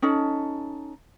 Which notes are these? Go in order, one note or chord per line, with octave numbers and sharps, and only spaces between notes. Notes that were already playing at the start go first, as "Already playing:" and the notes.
C#4 D#4 A4